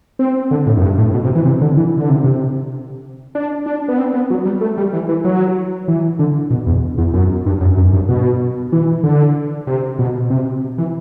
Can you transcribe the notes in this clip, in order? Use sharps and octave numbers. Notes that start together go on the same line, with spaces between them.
C4
D3
A2
F#2
G2
A2
B2
C3
E3
C3
D3
E3
D3
C3
C3
D4
D4
B3
C4
B3
F#3
G3
A3
G3
E3
E3
F#3
E3
D3
B2
E2
E2
F#2
G2
F#2
F#2
G2
B2
E3
D3
C3
B2
C3
E3